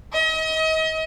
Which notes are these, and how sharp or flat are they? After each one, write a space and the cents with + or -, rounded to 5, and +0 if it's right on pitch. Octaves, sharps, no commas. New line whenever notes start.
D#5 +35